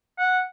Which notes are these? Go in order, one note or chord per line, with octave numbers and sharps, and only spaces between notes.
F#5